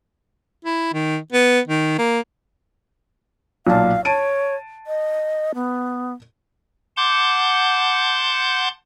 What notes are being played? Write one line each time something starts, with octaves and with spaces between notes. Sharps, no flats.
E4
D#3
B3
D#3
A#3
B1 A#2 F5 A5
C#5 A5 D7 D#7
D#5
B3
F#5 A5 C6 D6 G6